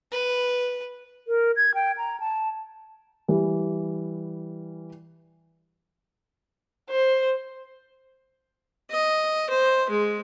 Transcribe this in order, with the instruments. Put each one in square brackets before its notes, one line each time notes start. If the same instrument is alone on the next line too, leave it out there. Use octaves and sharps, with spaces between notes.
[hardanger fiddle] B4
[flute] A#4
G#6
G5
A#5
A5
[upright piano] E3 G3
[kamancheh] C5
[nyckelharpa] D#5
C5
G#3